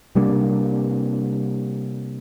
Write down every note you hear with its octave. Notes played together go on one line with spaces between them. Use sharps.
C3 G3 A#3 D4